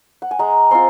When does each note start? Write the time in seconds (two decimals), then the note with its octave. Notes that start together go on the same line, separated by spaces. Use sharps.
0.22 F#5
0.31 G#5
0.39 G#3 A#5
0.71 C4 F4 C6